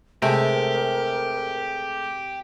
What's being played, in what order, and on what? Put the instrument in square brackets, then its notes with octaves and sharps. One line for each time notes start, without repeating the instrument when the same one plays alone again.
[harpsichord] A2 G#3 A3 [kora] C3 [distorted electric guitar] G4 [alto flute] A#4